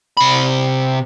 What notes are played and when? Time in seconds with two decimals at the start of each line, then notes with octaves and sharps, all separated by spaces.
0.17 C3 B5